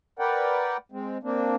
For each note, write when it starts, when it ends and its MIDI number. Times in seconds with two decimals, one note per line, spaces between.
0.19 0.77 70
0.19 0.77 71
0.19 0.77 74
0.19 0.77 78
0.19 0.77 79
0.92 1.18 56
0.92 1.18 60
1.23 1.56 58
1.23 1.56 60
1.23 1.56 62